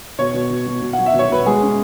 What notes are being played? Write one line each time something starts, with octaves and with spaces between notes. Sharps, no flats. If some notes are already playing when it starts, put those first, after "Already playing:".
B2 C#5
B2
B2
B2
B2
F#5
F#3
E5
B2
C#5
B2 B4
G#3 G#4
C#4